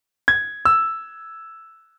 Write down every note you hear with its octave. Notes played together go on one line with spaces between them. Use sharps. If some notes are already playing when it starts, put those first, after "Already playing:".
G#6
E6